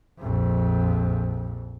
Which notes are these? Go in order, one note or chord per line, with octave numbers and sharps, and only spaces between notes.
A#1 F2